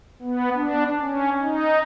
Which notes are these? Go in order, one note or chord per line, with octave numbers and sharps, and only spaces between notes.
B3
D4
C#4
D#4